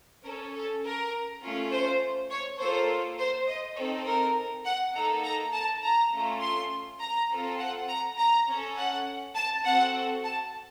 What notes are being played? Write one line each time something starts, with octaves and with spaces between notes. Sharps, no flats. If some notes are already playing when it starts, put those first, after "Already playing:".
C#4 A4 A#4
A4
A#4
A3 C#4 F4
C5
C#5
A#3 F4 A4 C5
C5
D#5
C4 D#4 A4 C#5
A#4
F#5
A#3 D#4 A4 A#5
A#5
A5
A#5
A3 C#4 F4 A4
C6
A#5
C4 F4 A4
F#5
A#5
A#5
C#4 A4
F#5
A5
C4 F#4 A4 F#5
A5